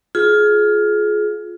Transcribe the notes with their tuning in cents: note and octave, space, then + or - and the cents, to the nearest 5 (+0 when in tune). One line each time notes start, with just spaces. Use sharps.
F4 +10 G#4 +25